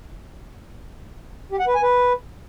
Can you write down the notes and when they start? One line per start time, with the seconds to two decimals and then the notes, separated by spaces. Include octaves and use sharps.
1.52 G4
1.60 F#5
1.67 B4
1.75 G#5
1.83 B4